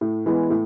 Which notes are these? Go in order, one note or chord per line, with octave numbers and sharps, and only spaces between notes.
A2
E3 G#3 B3
A2